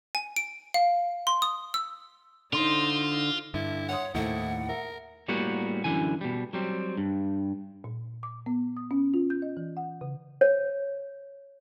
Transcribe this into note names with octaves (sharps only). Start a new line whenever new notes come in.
G#5
D7
F5
C6
D#6
E6
D3 D#4 F4 C5 C6
G2 D3 E4
C#5 E5 F#5 C6 D#6
D#2 A2 D#3 A3 E4 C5 F#5
A#4 E5
A2 G3 A#3 B3 F#4
F#2 D3 E3 G#5
B2 G3
F#3 G3 C4
G2
A#2
D6
B3
D#6
C#4
F4
G6
D#5
E3
F#5
C#3
C#5